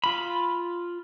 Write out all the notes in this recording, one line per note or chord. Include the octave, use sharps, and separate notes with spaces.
F4 B5